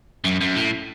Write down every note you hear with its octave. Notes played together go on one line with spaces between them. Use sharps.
F#2
F#2
A2